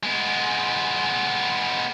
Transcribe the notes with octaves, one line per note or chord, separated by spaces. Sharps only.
G#3 B3